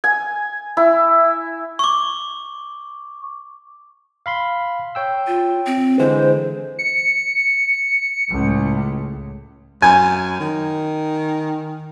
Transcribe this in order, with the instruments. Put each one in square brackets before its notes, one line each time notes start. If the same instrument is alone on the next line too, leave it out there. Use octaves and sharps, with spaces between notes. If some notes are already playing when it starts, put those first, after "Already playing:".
[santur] G#5
E4
[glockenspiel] C#6 D6
[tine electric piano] F5 B5 C6
C#5 G5 E6
[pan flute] F4
C4
[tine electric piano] D3 E3 G#3 [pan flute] C5
[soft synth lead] C#7
[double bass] C#2 A2
[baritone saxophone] F#2 [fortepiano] G#5
[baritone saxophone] D#3